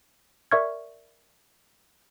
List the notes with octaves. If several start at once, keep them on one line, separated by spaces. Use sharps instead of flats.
A#4 D5 E5 C#6 F6 G#6